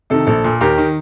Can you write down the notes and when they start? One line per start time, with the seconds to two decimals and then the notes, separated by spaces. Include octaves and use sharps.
0.10 C3 D#3 A4
0.27 A#1 A4
0.44 A#2
0.61 D#2 G4 A#4
0.78 D#3